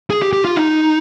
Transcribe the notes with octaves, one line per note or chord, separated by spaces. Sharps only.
G#4
G4
G4
F4
D#4